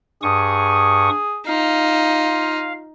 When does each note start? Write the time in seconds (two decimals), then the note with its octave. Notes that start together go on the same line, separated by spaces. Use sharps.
0.23 G2 G#4 C#6 D#6
1.47 D#4 F4 F5